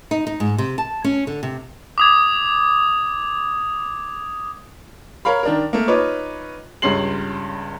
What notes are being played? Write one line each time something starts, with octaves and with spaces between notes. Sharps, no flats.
D#4
D#4
G#2
C3
A5
C#4
D3
C3
D6 D#6 G#6
A#4 C#5 F5 B5
D#3 D4 A#4
A3 A#3
D#4 F4 B4 C#5 D6
C#2 G2 C#4 C6 C7 F#7